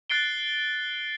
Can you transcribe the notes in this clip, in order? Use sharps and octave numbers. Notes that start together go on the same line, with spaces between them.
F#6 A6 C7 D7 G7